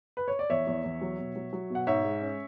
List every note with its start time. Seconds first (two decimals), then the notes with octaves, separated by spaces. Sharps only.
0.17 B4
0.28 C#5
0.39 D5
0.50 E2 C#5 E5
0.67 E2
0.84 E2
1.01 F#3
1.19 B2
1.36 F#3
1.53 F#3
1.70 B2 F#5
1.87 G#2 C#5 E5
2.04 G#3
2.22 C#4